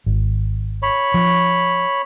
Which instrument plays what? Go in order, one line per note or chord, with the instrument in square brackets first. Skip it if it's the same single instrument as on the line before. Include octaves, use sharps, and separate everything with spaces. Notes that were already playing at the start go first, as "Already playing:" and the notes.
[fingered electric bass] G#1
[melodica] C#5 B5
[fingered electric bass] F3